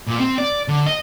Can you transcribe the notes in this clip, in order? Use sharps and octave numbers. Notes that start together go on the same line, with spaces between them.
A#2
C4
D5
D3
D#5